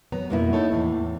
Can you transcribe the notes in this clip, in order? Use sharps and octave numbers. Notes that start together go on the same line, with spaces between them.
F#3 B3 A#5
F2 B2 A#3 B3 E4
D#4 A4 C#5
E2 A2 E3